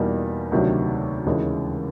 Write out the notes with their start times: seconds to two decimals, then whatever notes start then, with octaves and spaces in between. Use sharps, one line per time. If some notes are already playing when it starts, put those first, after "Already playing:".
Already playing: E2 B2 G3 A#3 D#4
0.52 D2 C3 D#3 F#3
1.27 D#2 C#3 E3 G#3